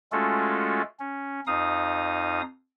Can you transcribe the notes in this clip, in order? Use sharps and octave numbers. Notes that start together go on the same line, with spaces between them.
G#3 A3 C#4 F4 F#4 A4
C#4
F2 D#4 F5 D#6